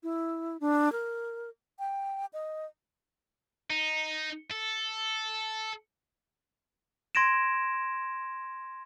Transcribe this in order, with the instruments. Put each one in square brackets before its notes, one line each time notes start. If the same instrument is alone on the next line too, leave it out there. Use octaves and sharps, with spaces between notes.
[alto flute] E4
D4
A#4
G5
D#5
[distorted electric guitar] D#4
A4
[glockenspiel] C6 G#6 A#6 D7 E7